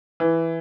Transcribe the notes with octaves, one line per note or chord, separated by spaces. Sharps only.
E3